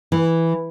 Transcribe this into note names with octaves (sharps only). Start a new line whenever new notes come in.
E3